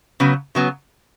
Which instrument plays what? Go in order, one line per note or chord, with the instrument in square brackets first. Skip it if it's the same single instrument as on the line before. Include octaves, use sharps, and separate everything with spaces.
[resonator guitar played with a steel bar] C#3 F#3 B3
C#3 F#3 B3